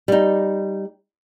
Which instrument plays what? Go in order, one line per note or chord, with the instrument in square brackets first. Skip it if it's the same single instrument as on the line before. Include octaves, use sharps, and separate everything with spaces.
[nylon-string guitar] G3 D#4